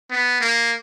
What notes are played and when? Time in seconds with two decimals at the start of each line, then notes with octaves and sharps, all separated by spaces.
0.11 B3
0.41 A#3